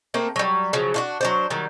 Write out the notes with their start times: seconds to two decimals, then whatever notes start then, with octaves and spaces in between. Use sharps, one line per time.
0.14 A3 A#3 C4
0.36 F#3 G3
0.73 C#3 F3 F#3
0.94 D4 F4 F#4
1.21 F#3 D4 C5
1.50 D#3 F#3 G3